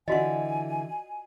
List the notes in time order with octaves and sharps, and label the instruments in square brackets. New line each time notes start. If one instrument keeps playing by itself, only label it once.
[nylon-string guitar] D3 E3 [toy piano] F4 F#4 D#5 [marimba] D5 F#5 [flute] G#5